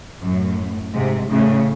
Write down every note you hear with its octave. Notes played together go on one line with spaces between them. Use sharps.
F#2 A2
G#2 C3
A2 C#3